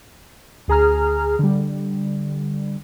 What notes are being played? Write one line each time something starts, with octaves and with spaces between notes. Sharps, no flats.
D2 G#4 A#5 F6
D3 G3